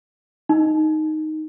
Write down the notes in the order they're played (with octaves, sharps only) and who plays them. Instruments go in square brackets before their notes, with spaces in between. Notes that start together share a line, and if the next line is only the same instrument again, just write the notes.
[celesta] D#4